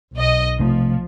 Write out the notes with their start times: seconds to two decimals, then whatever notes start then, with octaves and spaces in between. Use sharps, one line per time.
0.16 B1 D#5
0.60 C3 F3 A3